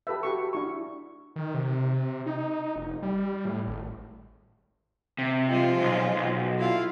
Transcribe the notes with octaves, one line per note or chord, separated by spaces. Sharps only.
G4 A4 B4 E5
F#4 G4 C#6
D4 E4 C#6
D#3
C3
D#4
F1
G3
A2
G#1
C3
F3 G#3 F4
B1
B1
E4 F4 F5